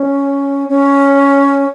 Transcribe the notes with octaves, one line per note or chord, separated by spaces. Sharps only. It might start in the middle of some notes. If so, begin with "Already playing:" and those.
Already playing: C#4
C#4